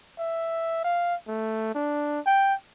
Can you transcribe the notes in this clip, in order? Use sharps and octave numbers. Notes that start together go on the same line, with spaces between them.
E5
F5
A3
D4
G5